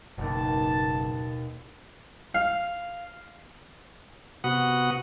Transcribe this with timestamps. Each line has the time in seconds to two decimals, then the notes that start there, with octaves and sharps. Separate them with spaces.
0.18 F#1 D#2 B2 A5
2.35 F5
4.44 C3 B3 F#4 F#5 D#6